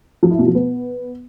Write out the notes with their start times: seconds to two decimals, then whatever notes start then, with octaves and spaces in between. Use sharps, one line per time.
0.23 F3
0.31 E4
0.39 B2
0.47 F3
0.55 B3